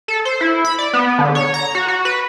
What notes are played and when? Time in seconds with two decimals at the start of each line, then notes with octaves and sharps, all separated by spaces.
0.08 A4
0.25 C5
0.41 E4
0.65 B5
0.79 D5
0.93 B3
1.19 D3
1.35 C#5
1.54 A#5
1.75 F#4
1.88 F#4
2.05 B4